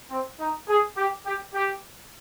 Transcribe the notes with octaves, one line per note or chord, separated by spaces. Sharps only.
C4
D#4
G#4
G4
G4
G4